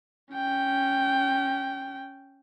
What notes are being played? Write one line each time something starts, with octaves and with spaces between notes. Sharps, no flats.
C#4 G5